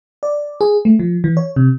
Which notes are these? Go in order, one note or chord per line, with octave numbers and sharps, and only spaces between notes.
D5
G#4
A3
F3
E3
C#5
C3